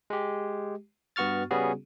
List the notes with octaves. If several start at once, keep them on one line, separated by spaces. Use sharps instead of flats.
G#3 G4
G2 B3 F#4 C#6 F6 A6
C#3 G3 B3 C#4 F#4 G#4